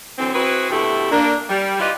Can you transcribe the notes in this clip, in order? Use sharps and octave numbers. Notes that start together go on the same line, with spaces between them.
D3 E3 F#3 C4
C4 E4 F#4 G#4 B4
B2 D3 A3 E4 G4
A#3 D4
G3
E4 F4 G4 B4 D5 D#5